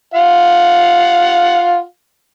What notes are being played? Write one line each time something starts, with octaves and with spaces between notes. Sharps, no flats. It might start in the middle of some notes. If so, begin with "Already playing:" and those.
F4 F5 F#5